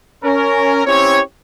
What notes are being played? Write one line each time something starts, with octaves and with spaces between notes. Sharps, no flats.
C#4 A#4
C4 C#4 E4 G4 C#5